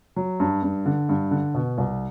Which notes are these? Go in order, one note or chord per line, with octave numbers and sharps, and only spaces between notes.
F#3
G2
G2
D3
G2
D3
B2
C2